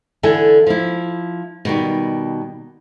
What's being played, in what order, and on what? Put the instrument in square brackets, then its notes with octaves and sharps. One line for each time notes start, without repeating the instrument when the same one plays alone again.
[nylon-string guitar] D3 E3 A4 E5 G#5
F3 E4
B2 D#3 G3